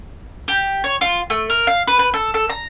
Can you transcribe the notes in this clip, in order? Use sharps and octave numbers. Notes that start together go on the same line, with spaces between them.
G4
C#5
F4
A3
A#4
F5
B4
B4
A4
A4
A#5